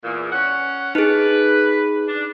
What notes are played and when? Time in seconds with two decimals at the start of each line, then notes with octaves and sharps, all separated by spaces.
0.03 E2 A#2
0.32 C#4 F#5
0.95 D#4 G#4 B4
2.08 D4